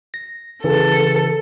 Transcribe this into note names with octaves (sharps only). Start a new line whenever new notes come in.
A#6
C#3 E3 A4